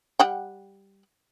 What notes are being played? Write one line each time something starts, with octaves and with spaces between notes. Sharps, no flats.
G3 F#5 G5